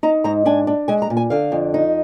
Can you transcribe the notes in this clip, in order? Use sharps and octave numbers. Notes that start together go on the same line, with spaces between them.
D#4 A#5
G#2 A#5
D4 G#5
D4
G#3 G#5
A#5
A#2
G#5
D3 F5
F2
D#4